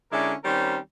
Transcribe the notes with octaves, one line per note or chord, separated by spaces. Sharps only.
D3 G#3 C#4 E4 A#4 D5
D#3 G3 C4 C#4 A#4 C5